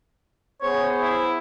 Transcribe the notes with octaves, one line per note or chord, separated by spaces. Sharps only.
B3 G#4 C5 C#5
E4